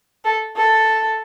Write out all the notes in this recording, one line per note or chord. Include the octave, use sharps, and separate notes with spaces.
A4
A4